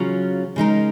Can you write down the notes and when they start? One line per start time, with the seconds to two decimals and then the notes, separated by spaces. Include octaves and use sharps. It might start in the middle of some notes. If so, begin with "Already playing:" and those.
Already playing: C#3 F#3 C#4 F4
0.56 C#3 G#3 D#4 A#4